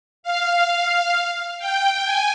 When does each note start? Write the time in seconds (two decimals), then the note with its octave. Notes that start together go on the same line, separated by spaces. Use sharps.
0.23 F5
1.59 G5
2.04 G#5